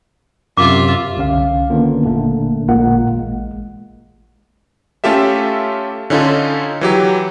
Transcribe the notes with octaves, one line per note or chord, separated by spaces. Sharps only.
F#2 C3 F4 E5 D6
C2 D3 C#4 F5
D3 D#3 A#3 B3 C#4 F4
G1 A#2 D3 A3 A#3
A1 A#2 G#3 A#3 F4 F#5
A1 G#3
A3 C#4 F4 G4 A4 E5
D3 C#4 D#4 F4 A4
E3 F#3 G4